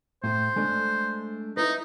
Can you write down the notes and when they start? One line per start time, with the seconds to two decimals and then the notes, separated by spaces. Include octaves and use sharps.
0.24 A2 C5
0.56 G#3 A3 D4
1.57 D#4 E4 B4